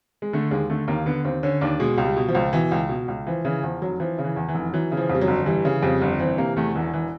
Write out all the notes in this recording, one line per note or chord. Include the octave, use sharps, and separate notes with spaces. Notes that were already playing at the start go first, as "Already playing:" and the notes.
G#3
D3 A3
D#2 G#3
D3 A3
D#2 A#3
D3 B3
D#2 C4
D3 C#4
D#2 D4
B2 G#3
C#2
G3
B2
F3
C#2
B2 E3
C#2
B2
C#2
E3 F3
C#3 E3
E2 F3
F1 F#3
E3 F3
C#3
E3
E2
E3
F1
E3 F#3
C#3
F3
F2
G3
F#3
G1
E3 G3
C#3
F2 G3
G1
E3 C4
C3 A#3
E2 A3
E1 E3
E3